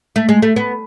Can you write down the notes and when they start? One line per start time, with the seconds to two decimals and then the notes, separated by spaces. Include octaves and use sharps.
0.16 A3
0.29 G#3
0.42 A3
0.56 B3